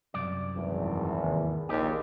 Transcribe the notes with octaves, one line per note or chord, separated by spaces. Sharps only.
C2 F#2 D5
G#1 E2
D#2
A#1 D#2 D#4 G4